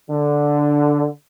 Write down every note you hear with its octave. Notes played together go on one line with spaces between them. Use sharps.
D3